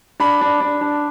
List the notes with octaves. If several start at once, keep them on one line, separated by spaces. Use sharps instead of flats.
D4 B5
D4
D4
D4